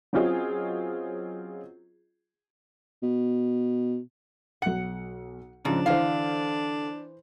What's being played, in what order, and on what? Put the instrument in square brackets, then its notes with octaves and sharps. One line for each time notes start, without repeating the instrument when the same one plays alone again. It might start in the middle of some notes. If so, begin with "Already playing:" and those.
[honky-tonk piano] F#3 C4 C#4 F4 G#4 D#5
[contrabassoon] B2
[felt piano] B1 C#7 [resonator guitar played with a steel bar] F#5
[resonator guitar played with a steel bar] G#2 [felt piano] C#3 F3 [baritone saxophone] D4
[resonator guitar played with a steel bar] D3 F5 [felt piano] E3 C5